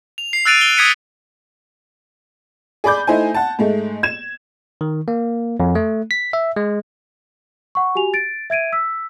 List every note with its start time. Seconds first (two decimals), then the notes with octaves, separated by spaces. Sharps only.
0.18 F7
0.33 C7
0.45 E6 F#6 A6 D7 D#7 F7
0.61 G7
0.77 D#6 G#6 B6 C#7 D#7
2.84 G#4 D5 B5 D6 G6
3.07 A3 D#4 E4 C5 G#5
3.34 F#5 A5
3.59 G#2 G#3 A3
4.03 G#6 E7
4.81 D#3
5.08 A#3
5.60 F2
5.75 A3
6.11 B6
6.33 E5
6.56 G#3
7.75 F#5 C#6
7.95 F#4 G4 G#5 F7
8.14 A6 D7
8.50 E5 G#6 D7 D#7
8.73 E6 B6